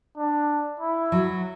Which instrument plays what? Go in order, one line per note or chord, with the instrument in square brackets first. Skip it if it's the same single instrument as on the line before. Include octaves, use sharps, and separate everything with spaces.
[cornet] D4
E4
[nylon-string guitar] F#3